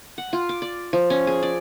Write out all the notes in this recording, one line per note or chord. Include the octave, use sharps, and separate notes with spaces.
F#5
F4
D6
D5
F3
C#4
G#4
D5